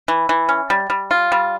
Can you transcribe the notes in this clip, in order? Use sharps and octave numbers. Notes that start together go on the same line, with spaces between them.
E3
E3
C#4
G3
G3
F4
G3